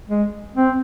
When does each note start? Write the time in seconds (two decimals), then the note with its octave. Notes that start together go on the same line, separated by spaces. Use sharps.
0.09 G#3
0.56 C4